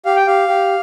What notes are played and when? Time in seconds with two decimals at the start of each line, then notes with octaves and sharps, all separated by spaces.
0.05 G4 F5
0.16 G5
0.27 G4 F5
0.48 G4